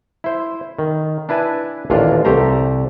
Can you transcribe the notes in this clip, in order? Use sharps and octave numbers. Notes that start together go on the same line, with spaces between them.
E4 C5
D#3
D4 E4 B4 G#5 A5
A1 D#2 A#2 D4 F4
C2 A3 G4 C5 A#5